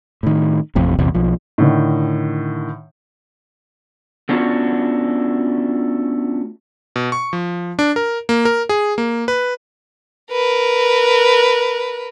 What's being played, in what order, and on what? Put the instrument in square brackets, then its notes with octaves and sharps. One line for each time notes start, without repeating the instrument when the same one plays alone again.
[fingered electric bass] A2 D#3
A1 F2 A2 C3
A#1 E2 C3
B1 F3
[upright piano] A2 D3 D#3
[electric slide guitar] A3 B3 C#4 D4 F4 F#4
[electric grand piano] B2
C#6
F3
D4
A#4
A#3
A#4
G#4
A#3
B4
[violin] A#4 B4